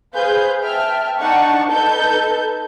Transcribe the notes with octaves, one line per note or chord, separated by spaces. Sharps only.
G#4 B4 C5 F5 G6
E5 G5 A5 F6
D4 D#4 F#5 A5 C#6
D#4 A4 B4 A5 G6